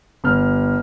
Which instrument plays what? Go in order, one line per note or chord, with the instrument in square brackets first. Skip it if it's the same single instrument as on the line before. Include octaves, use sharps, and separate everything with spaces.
[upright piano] G1 F6